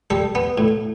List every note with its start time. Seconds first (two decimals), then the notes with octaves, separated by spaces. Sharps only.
0.10 G3 A4
0.35 B3
0.58 A2